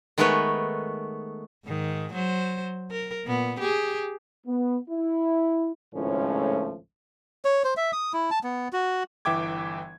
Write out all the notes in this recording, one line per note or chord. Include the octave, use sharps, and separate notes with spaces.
D#3 G#3 A3 B3 B4 C#5
G#2 D#3
F#3 C5
A#4
A#2 B3
G4 G#4
B3
E4
G#1 C#2 A2 F3 A3 C#4
C#5
C5
E5
D#6
E4
A5
B3
F#4
G1 E3 E5 G5 D6 G#6